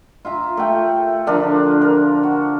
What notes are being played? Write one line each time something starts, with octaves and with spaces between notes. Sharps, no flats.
F4 E5 A#5
A3 G5
D3 F3 D4 A#4
A#4
F#4